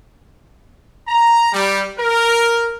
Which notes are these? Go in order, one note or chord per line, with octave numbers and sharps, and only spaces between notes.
A#5
G3
A#4